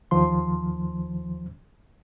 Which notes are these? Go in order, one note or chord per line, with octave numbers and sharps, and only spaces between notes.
D#2 D#3 F3 C6